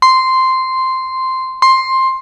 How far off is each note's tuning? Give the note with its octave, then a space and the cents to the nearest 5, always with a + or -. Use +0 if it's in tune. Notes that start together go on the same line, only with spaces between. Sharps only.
C6 -5
C6 +10